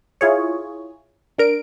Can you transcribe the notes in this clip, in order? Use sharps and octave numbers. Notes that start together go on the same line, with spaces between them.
E4 F4 G#4 C#5
D4 A#4 D7